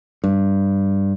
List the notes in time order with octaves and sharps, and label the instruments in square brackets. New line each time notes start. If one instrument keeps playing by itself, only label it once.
[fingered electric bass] G2